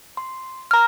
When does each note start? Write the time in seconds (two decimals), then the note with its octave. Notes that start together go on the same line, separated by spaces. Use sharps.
0.17 C6
0.71 A#5 F6